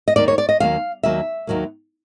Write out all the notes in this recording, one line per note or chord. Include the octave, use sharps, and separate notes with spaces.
D#5
D#2 D#3 F#3 A#3 D5
C#5
D5
D#5
D#2 D#3 F#3 A#3 F5
D#2 D#3 F#3 A#3 E5
D#2 D#3 F#3 A#3